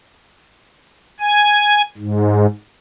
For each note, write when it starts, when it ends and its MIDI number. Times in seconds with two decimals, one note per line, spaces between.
1.20 1.82 80
1.98 2.46 44